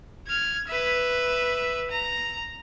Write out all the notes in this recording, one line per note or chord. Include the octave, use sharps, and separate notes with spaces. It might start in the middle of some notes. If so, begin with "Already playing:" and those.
F6 G#6
B4 E5
A#5